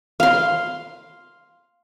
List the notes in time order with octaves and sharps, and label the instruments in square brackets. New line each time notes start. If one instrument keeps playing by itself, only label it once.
[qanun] F5 C6